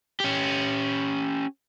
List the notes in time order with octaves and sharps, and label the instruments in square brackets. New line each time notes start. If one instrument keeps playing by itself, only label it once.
[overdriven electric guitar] C#4 G4